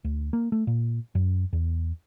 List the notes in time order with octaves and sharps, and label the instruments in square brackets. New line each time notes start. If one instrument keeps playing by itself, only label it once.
[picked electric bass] D2
A#3
A3
A#2
F#2
E2